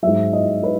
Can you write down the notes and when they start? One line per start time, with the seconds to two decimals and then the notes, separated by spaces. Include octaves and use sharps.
0.02 G#2 F#3 E5
0.33 D#5
0.63 B4